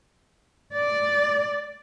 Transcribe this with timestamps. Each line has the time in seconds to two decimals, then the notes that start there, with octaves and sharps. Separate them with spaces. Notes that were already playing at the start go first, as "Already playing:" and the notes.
0.74 D5